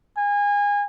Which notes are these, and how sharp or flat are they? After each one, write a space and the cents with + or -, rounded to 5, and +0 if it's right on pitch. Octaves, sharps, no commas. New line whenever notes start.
G#5 -25